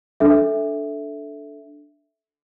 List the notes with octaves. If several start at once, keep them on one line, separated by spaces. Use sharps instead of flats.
D4 A4 E5